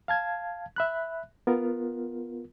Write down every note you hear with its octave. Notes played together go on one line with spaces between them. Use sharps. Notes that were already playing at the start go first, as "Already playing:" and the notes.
F5 A5 G#6
E5 B5 F#6
B3 F4 A#4